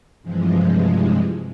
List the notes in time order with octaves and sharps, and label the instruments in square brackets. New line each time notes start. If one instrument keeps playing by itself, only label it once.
[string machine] G2 C3 E3 F3 G#3